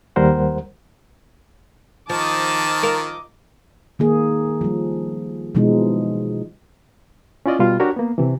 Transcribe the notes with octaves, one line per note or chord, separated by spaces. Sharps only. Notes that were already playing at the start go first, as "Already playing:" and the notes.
D#2 G3 A#4 C5 F#5
D#3 F3 D#5 A5 D6
F4 A#4
D#3 A#3 G#4
F3 G3
B2 E3 F3 G#3 D#4
C#4 E4 F4 D5 D#5
B2 G3 F4
D4 F#4 G4 A#4 C#5
A#3 B3
C3 E3